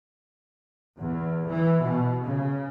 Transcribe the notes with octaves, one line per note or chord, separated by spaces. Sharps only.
E2
E3
B2
C#3